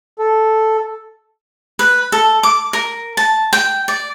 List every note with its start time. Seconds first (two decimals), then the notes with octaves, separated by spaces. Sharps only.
0.19 A4
1.79 B4
2.12 A4
2.43 D6
2.73 A#4
3.17 A5
3.53 G5
3.88 D5